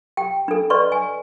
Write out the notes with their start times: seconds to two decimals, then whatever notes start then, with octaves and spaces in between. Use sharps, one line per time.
0.17 G4 G5
0.48 D4 A4
0.70 B4 D5 D#5 C6 C#6
0.92 G#5